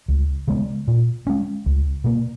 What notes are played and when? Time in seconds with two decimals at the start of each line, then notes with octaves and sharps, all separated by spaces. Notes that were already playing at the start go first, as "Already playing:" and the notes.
0.08 C#2
0.48 C#3 G#3 B3
0.88 A#2
1.27 G#3 C#4
1.66 C#2
2.04 B2 A#3